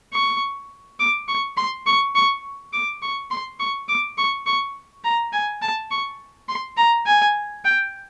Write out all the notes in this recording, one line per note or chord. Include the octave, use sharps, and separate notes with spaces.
C#6
D6
C#6
C6
C#6
C#6
D6
C#6
C6
C#6
D6
C#6
C#6
A#5
G#5
A5
C#6
C6
A#5
G#5
G5